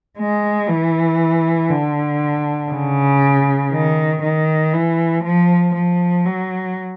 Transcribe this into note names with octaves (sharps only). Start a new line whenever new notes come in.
G#3
E3
D3
C#3
D#3
D#3
E3
F3
F3
F#3